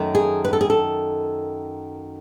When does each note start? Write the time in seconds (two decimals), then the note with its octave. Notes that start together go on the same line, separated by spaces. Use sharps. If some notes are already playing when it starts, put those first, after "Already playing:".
Already playing: F#2 D#3 A3
0.15 G#4
0.45 B4
0.53 A4
0.61 G#4
0.70 A4